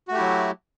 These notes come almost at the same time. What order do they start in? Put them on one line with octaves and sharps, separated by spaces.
F#4 A3 G4 E4 F#3